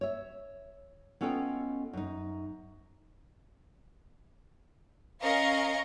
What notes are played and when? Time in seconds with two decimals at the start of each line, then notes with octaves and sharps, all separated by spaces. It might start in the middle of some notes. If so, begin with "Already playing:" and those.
0.01 C#5 E5
1.21 B3 C#4 F4 A4 D#5 G5
1.93 F#2 D#4
5.22 C#4 A#4 D#5 F5 A#5 C#6